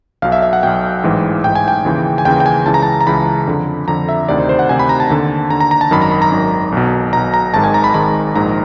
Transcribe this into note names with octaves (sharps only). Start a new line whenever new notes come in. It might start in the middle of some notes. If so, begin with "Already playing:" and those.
B1 B2 F5
E5
E5
F#5
B1 B2 G5
A1 G#2 E3
A1 G#2 E3 G5
G#5
G5
D#2 C#3 E3
G#5
D#2 C#3 E3 G5
G5
G#5
C#2 C#3 E3 A5
A#5
A5
A#5
C#2 C#3 E3 B5
F2 D3
F2 D3 A#5
E5
D2 C3 D#3 D5
C5
C5
F#5
D2 C3 D#3 G#5
B5
A#5
A5
D#2 D3
D#2 D3 A#5
A#5
A#5
A5
G#1 F#2 D#3 B5
A#5
B5
A#5
G#1 F#2 D#3
B1 B2
B1 B2 A#5
A#5
G#1 G#2 D#3 A5
G#5
A#5
B5
G#1 G#2 D#3 B5
A#1 G#2 D#3 A#5